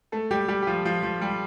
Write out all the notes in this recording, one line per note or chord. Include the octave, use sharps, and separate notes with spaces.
A3 A4
G3 G4
G3 G4
G4
F3 F4
F3 F4
F3
G3